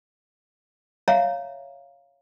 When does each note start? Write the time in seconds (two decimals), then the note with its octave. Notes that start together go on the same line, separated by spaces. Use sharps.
1.08 C#5 E5 F5 A#5